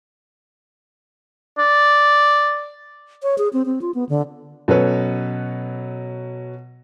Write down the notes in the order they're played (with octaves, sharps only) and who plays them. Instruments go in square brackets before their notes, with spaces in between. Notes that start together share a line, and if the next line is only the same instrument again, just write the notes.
[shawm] D5
[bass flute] C#5
G#4
C4
C4
F4
B3
D3
[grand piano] B2 F#3 C#4 A4 B4 C#5